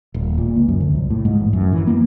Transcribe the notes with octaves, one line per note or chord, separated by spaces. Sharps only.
D#1
A#2
C#2
F#2
D2
C2
A2
G#2
A1
F#2
E3
A#3